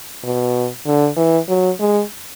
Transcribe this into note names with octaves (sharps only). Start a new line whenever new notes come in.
B2
D3
E3
F#3
G#3